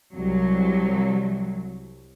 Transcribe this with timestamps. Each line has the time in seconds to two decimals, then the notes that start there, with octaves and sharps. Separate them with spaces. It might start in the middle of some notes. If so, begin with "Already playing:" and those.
0.15 C2 F#3